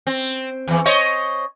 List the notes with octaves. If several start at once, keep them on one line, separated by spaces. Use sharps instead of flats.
C4
E2 E3
C5 C#5 D#5